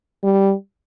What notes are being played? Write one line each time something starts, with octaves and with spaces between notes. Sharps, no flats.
G3